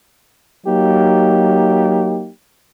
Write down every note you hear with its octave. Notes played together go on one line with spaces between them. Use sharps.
F#3 A#3 D#4 G4